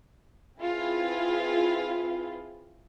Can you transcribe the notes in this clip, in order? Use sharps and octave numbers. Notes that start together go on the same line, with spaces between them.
C4 E4 F4 G#4 B4